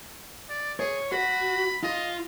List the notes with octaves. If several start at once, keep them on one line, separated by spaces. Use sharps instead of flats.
D5
G#4 C#5
F#4 B5
F4 D#5